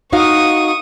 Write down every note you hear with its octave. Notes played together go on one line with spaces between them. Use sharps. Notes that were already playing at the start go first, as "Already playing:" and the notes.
D#4 F#4 F5 C#6 D#6